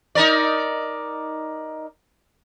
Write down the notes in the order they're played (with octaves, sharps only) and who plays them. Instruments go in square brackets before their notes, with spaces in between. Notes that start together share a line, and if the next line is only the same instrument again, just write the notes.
[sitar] D#4 A#4 D5